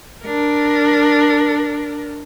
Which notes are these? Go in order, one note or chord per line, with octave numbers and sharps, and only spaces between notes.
D4 A#4